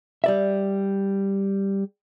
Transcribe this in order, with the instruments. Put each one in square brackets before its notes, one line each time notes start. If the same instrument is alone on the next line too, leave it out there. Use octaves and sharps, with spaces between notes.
[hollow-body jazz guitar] G3 D5 E5